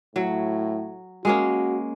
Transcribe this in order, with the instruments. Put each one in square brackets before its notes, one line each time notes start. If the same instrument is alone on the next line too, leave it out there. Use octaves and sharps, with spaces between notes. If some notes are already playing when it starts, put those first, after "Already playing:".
[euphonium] A2 [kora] F#3
[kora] G#3 A#3 C#4 [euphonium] F#4